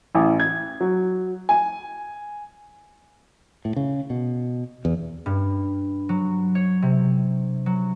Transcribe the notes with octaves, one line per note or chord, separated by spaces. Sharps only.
A1
G#6
F#3
G#5
A2
C#3
B2
E2
G2
F#3
C#5
C3
F#3